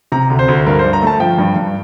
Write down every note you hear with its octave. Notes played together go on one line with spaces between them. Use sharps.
C3 A#5
D2
C5
D2
G2 A#4
C5
G2
A#5
A3 A5
F3 G5
G2
G2